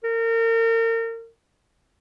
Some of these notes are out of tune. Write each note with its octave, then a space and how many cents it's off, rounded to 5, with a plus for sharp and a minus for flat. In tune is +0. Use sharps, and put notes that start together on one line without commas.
A#4 -35